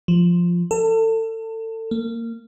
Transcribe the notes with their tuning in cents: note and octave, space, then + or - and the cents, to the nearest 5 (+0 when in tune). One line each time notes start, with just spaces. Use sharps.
F3 +0
A4 +30
A#3 -20